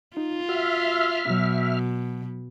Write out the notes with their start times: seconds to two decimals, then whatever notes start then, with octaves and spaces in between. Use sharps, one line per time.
0.17 D#4 F4
0.49 F#4 E5 F6
1.30 B2 F#3